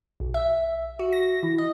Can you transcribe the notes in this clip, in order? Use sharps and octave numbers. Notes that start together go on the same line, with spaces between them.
B1
E5
F#4
A#6
E3
D#5